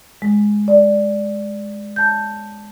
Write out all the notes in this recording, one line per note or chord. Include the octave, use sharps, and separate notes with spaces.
G#3
D5
A5 G6